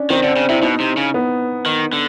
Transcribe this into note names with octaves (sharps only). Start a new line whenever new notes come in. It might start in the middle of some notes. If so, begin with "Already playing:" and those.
Already playing: C#4 D4
D#3 C4
D3 D4
C#3
C3 E4
B2 D#4
C3
C#3
B3
D#3
D3